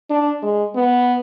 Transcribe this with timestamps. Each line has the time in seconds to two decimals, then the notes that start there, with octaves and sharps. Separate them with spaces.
0.10 D4
0.42 G#3
0.75 B3